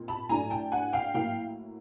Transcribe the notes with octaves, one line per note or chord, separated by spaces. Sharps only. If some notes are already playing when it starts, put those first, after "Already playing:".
Already playing: A#2 C4 D#4
A5 B5
A2 F#3 A3 D4 G#5 A#5
G5 A5
F#5 G#5
F5 G5
A2 F#3 A#3 F5 G5